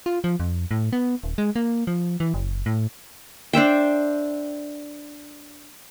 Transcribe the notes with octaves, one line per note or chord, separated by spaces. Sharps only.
F4
F3
F2
A2
B3
D#1
G#3
A#3
F3
E3
F#1
A2
D4 C5 E5 G5